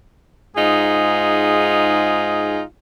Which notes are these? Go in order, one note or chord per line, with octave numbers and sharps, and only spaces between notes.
G#2 D#4 F4 G#4